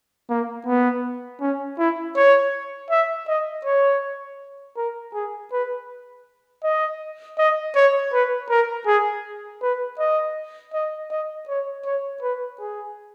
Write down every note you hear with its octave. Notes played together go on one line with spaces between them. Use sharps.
A#3
B3
C#4
E4
C#5
E5
D#5
C#5
A#4
G#4
B4
D#5
D#5
C#5
B4
A#4
G#4
B4
D#5
D#5
D#5
C#5
C#5
B4
G#4